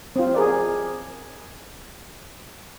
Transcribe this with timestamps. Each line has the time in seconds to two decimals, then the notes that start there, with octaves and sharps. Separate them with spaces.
0.16 C4 F4
0.35 G#4 A#4 D5